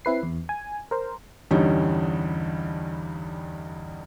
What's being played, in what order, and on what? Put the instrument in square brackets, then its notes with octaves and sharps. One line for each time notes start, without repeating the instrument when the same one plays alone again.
[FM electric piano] C4 E4 B4 C7
E2
G#5
A#4 C5
[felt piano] E2 G2 D3 G3 C#4 D#4